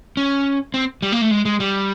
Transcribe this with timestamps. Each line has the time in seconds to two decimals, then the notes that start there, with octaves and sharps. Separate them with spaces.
0.17 C#4
0.74 C4
1.02 G3
1.12 A#3
1.21 A3
1.31 G#3
1.45 G#3
1.60 G3